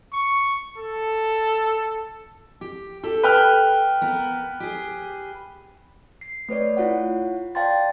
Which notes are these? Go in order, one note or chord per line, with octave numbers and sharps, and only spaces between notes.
C#6
A4
G4
G4 A4
B4 G5 F6
B3 A#4
G4 G#4
C7
A3 B4 C#5 D5
E4 F4 C#5 F#5
D5 F5 G5 A5 C6 A6